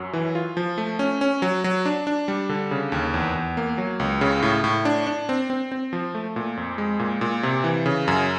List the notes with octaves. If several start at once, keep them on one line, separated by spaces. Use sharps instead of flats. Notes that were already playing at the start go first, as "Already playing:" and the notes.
Already playing: F#2 F#3
E3
F4
F3
A3
C#4
C#4
F#3
F#3
D4
D4
G3
D3
C#3
D#2
E2
E2
A#3
F#3
C#2
C#3
A2
A2
D4
D4
C4
C4
C4
F3
A3
A#2
F2
G#3
A#2
A#2
C3
E3
C#3
F#2